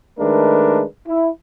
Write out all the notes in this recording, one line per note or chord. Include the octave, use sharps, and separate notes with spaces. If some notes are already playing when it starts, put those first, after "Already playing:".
D#3 G#3 A3 D4 A#4 B4
E4